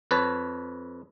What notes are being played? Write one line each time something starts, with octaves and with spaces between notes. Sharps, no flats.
F2 B4 C#5 A5